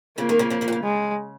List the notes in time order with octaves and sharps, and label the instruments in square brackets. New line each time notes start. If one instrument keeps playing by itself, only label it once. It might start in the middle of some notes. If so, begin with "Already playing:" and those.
[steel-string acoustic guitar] C#3 F3 [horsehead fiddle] A#3
[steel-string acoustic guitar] D#3 G#3
C#3 F3
C#3 F3
C#3 F3
A#2
C#3
[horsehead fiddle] G#3